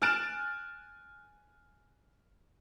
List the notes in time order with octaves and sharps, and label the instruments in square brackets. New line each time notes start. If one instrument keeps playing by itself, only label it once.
[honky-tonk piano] G#5 F6 F#6 A6 D7 E7